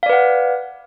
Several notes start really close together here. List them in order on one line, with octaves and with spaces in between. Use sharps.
F5 D5 B4 F#5